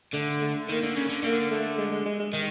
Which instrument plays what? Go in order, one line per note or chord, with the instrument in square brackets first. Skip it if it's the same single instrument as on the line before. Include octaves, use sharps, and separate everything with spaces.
[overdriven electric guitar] D3 [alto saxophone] A3
[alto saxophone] A3
[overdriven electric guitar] D#3 [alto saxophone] A#3
[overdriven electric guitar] D3
C#3
D3
[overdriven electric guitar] D3 [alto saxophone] A#3
[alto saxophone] A3
G#3
G#3
G#3
G#3
[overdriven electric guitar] D#3 [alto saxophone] G#3